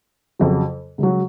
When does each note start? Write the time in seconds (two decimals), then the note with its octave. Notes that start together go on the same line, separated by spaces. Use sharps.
0.39 F2 C#3 F#3
0.98 C#2 C#3 F#3